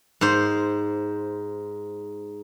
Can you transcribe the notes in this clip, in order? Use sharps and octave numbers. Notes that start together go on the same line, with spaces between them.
G#2 C5